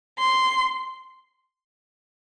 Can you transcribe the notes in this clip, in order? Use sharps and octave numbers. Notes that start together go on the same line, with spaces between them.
C6